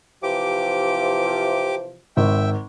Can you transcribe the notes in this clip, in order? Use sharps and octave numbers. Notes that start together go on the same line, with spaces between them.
C3 E3 F3 G4 D6
G#1 E5 G5